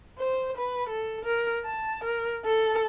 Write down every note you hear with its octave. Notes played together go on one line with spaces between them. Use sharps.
C5
B4
A4
A#4
A5
A#4
A4